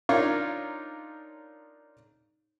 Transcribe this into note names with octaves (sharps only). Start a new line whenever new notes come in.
D4 D#4 F4 A#4 C#5